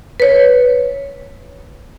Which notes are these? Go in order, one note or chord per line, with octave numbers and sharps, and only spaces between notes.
B4 C#5